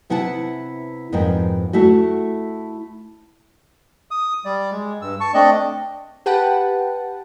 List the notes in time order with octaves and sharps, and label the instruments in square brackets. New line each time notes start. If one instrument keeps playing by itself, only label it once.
[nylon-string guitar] C3 B3 E4 F#5 A5
F2 G#2 B3 A#4 G5
A3 E4 F#4
[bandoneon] D#6
G3 D5
G#3
G2 E6
A5 C#6
A3 C4 D4 D5 D#5
[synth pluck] G4 B4 F#5 G5 A5